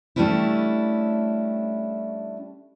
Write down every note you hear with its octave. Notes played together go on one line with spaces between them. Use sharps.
G3 A3 C#4 D4 E4